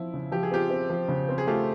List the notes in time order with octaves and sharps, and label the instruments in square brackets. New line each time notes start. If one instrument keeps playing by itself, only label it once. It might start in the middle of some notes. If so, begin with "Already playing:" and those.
Already playing: [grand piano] F3 C4 [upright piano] E4
[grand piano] C#3
[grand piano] F3 [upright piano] G4
[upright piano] G#4
[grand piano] C4 [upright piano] F4 G4
[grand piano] C4
F3
C#3
C4
[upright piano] G#4
[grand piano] A3 [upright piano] F4 G4